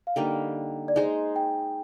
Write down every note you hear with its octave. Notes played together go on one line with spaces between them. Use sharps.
F5
D3 G3 A#3 D#4 G5
D5
G#3 D#4 G#4 C5 D#5
G5